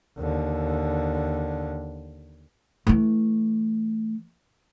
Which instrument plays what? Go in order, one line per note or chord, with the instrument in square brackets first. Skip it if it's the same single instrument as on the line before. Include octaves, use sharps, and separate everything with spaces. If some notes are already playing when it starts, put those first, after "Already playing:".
[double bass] D#2 D3
[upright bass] E3 A3